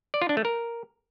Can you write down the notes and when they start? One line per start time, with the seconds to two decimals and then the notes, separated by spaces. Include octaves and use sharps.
0.14 D5
0.22 F4
0.29 D4
0.37 A3
0.45 A#4